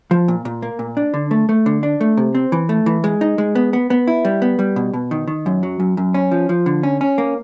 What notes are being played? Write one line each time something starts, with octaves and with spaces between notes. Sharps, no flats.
F3
A#2
A#2
A#3
A#2
D4
D3
A3
A3
D3
D4
A3
C3
C4
E3
A3
E3
G#3
D#4
G#3
B3
B3
B3
E4
G3
B3
G3
B2
B2
D#3
D#3
F#2
F#3
F#2
F#2
C#4
F3
F3
D3
C#4
C#4
A#3